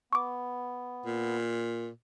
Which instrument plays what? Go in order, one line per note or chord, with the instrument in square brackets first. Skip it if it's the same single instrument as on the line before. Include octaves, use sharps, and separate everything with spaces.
[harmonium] B3 [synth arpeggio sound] C#6 D6
[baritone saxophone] A#2